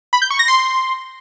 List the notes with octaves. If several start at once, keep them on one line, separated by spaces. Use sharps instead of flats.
B5
G6
C#6
A#6
C6